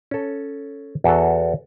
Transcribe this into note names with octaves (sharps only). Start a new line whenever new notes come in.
C#4 A4
E2 F#4 A4